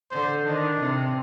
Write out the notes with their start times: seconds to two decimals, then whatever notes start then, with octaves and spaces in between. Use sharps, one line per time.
0.11 D3 C5
0.45 D#3 D4
0.80 C3